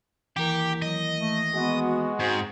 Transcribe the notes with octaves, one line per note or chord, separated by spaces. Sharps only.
D#2 E3 G4 A#4
F#3 D#5
A3
G#3 B3 F#4
G#2 C4 G#4